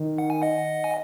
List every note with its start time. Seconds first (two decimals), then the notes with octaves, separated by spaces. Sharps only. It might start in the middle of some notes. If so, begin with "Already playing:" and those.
Already playing: D#3
0.18 F#5
0.30 G#5
0.42 D#5 F#5
0.84 G#5